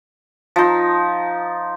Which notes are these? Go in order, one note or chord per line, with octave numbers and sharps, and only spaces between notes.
F3 D#4